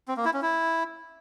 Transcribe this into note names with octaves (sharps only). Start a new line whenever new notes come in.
C4
A#3
E4
C#4
E4